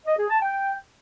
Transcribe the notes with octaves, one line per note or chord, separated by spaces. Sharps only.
D#5
G#4
A5
G5